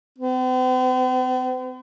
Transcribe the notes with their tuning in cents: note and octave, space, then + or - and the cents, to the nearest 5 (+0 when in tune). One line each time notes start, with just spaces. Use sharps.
C4 -45